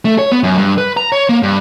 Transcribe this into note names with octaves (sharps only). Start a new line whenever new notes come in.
A3
C#5
B3
F#2
G2
B4
A#5
C#5
A#3
G2